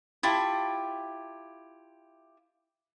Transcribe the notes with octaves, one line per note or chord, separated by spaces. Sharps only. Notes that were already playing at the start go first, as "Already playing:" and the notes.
E4 F4 G4 A5